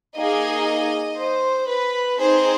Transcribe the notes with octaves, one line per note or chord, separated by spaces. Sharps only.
A#3 D#4 G#4 D#5
C5
B4
C4 D#4 G#4 C5